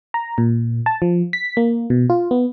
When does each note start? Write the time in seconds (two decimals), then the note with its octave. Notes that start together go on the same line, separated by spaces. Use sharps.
0.14 A#5
0.38 A#2
0.86 A5
1.02 F3
1.33 B6
1.57 A#3
1.90 B2
2.10 F4
2.31 B3